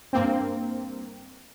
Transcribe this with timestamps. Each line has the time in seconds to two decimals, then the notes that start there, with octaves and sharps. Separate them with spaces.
0.13 G2 A#3 C4